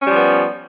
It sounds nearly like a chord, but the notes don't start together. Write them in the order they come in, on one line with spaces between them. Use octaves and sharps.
C#4 G3 F3 B3